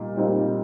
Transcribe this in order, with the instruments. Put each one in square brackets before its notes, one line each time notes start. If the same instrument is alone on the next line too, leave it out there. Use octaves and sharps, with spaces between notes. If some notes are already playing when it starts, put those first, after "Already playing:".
Already playing: [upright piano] A#2 G3 D#4
A#2 G3 C4 D#4